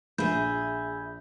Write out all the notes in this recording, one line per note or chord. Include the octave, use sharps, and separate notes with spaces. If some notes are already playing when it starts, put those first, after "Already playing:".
A#1 G#4 E5 B5 G6